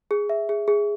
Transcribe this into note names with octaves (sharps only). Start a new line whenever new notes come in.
G#4
E5
G#4
G#4